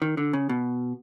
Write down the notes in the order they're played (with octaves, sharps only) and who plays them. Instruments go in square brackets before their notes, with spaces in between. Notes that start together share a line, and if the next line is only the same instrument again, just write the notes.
[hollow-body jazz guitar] D#3
D3
C#3
B2